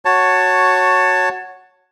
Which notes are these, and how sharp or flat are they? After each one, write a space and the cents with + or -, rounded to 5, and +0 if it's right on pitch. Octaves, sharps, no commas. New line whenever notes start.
F#4 +0 C#5 +0 A5 +20